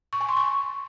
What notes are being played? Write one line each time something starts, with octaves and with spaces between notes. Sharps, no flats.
C#6
G#5
C6
C#6